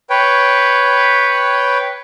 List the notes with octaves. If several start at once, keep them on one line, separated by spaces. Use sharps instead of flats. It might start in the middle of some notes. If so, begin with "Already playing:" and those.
B4 C#5 G5